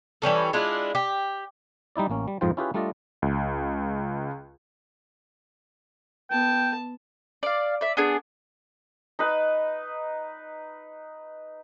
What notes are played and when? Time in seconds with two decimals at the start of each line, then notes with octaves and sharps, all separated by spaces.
0.22 E3 G3 C#4 A4
0.53 G#3 D4 E4 F4
0.95 G4
1.96 G3 D#4 E4 D5
2.10 A1 A#3 C#4
2.28 G3
2.41 F2 G#2 F3 F4 C5 G5
2.57 C#4 E4 F4 G4 G#4 B4
2.74 G3 A3 D4 F4 D5 D#5
3.22 C#2
6.30 B3 G5 A5
7.43 D5 F5
7.81 D5 E5
7.97 B3 D4 G#4
9.19 D#4 B4